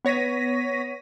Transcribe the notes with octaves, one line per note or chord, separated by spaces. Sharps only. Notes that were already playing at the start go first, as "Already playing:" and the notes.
B3 C#5 A#6 B6 D#7